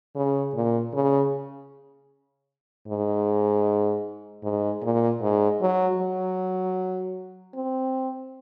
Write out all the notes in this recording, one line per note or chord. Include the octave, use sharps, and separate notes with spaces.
C#3
A#2
C#3
G#2
G#2
A#2
G#2
F#3
F#3
C4